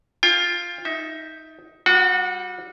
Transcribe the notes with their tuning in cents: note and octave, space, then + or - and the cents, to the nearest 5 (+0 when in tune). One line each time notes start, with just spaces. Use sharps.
F4 +0 G5 +35
D#4 +15 E5 -10
G3 +0 F#4 -30 F#5 +25